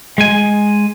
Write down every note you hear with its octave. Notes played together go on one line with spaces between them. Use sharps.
G#3 G#5